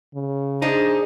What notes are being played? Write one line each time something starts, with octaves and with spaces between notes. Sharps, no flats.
C#3
D4 D#4 G#4 C5 D#5